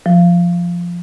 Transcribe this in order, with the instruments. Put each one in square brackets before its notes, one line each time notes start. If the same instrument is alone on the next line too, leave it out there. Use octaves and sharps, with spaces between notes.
[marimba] F3